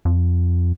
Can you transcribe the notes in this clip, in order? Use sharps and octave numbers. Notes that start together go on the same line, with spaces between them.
F2